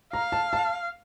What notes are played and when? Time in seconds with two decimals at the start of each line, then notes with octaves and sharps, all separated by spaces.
0.13 F5 A#5
0.32 A5
0.53 A5